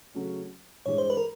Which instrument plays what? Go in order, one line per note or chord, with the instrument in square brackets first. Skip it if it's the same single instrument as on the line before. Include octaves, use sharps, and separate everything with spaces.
[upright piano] C#3 F#3 A3 C#4
[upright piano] G2 E3 G#3 [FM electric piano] C#5
[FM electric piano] C5
B4
A#4